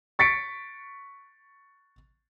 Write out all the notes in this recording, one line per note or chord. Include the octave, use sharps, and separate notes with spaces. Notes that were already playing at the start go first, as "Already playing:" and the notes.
C#6 A6 B6 C#7 D7